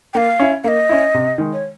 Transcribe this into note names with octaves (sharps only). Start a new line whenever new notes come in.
A#3 F5 G5
C#4 E4
A#3 D#5 F5
C#4 E4
C3
D#3 G#3
C#5